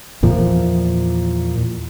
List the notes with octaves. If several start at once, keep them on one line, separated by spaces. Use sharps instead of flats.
E2 A#2 F3